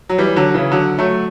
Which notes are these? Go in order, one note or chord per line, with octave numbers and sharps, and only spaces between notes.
F#3
E3 G3
D3 F#3
F#3
C#3 E3
D3 F#3
F#3 A3